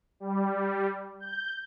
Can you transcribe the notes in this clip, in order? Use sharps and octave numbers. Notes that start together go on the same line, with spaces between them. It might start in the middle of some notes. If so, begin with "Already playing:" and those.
G3
G6